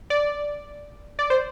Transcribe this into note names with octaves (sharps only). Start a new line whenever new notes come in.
D5
D5
C5